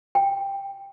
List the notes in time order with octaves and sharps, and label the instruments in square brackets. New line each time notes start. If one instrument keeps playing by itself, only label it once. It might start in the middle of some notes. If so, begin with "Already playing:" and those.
[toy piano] G5